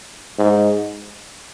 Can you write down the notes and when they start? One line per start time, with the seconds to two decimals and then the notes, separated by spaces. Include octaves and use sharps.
0.39 G#2